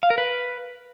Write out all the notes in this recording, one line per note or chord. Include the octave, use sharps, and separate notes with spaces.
F5
A#4
B4